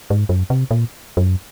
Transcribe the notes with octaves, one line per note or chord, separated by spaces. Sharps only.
G#2
F#2
C3
A#2
F#2